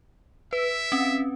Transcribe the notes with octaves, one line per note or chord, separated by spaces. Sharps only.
B4 E5
C4 C#4